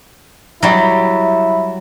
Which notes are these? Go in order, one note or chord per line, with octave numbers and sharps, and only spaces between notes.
F#3 G3 E4